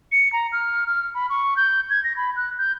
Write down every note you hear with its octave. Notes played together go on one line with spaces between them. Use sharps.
C#7
A#5
F6
F6
B5
C#6
G6
G#6
A#6
B5
F#6
G6